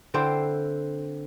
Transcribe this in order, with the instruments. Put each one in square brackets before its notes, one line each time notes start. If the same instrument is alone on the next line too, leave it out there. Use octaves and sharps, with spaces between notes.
[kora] D3 C4 E4 C5